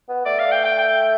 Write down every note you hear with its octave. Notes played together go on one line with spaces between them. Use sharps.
B3
A3 D5
F5
G5
G5
G5